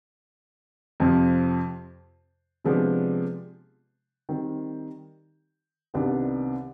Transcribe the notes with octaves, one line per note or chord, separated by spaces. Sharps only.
F2 C3 F3
C3 F3 G#3 B3 D4
D#3 G3 C4
C2 C3 D#3 B3 D4